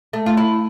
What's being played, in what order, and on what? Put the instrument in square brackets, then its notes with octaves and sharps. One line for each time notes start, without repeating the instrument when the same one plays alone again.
[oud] A3
F4
E4